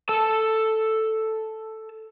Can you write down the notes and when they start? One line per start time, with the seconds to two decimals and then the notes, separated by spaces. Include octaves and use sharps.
0.09 A4 A5